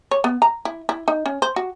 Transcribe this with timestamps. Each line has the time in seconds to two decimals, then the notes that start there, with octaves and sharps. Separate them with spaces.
0.11 C#5
0.24 B3
0.42 A#5
0.65 E4
0.89 E4
1.08 D#4
1.26 C#4
1.42 C5
1.56 F#4